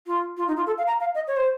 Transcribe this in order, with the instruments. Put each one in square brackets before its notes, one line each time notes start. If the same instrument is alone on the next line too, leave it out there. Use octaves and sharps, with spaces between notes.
[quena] F4
F4
D#4
F4
A4
F5
A#5
F5
D#5
C#5
C5